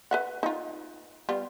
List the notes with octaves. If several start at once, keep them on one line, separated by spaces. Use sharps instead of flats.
B4 E5 F#5
D#4 F4
G3 B3 F4